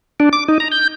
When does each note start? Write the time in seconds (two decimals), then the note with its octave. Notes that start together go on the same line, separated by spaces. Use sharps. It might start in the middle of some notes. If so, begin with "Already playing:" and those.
0.20 D4
0.33 D6
0.48 D#4
0.60 A#5
0.72 G6